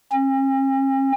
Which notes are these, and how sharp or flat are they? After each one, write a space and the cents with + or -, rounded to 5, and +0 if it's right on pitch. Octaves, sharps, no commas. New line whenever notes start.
C#4 -45